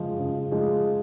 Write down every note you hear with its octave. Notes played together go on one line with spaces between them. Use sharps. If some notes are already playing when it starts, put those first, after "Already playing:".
Already playing: C#3 F3 G#3
C#3
F3 G#3